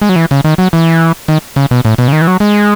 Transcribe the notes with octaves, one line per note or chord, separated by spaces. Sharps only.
G#3
F#3
E3
C#3
D#3
F#3
E3
D#3
C#3
B2
A2
B2
C#3
D#3
E3
F#3
G#3